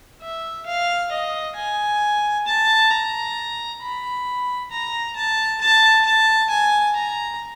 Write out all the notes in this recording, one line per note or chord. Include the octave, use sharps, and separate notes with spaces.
E5
F5
D#5
G#5
A5
A#5
B5
A#5
A5
A5
A5
G#5
A#5